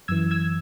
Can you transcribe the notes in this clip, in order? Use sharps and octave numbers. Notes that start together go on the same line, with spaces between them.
F#2 E3 E6 G#6
E6 G#6